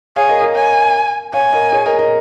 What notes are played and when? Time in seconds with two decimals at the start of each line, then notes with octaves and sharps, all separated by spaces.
0.16 G#4 C#5 F5
0.29 A#4 D#5
0.42 A#4 D#5
0.55 C#5 F5 G#5
1.34 C#5 F5 G#5
1.53 A#4 D#5
1.72 G#4 C#5
1.86 A#4 D#5
1.99 A#4 D#5